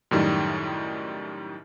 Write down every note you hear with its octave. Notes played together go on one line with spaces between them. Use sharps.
F#2 A2 D#3 G3